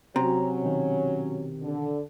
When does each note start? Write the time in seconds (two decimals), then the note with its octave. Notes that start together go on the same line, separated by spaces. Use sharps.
0.16 C3 F#3 C#4 F#4 A#5
0.62 B2 D#3
1.62 D3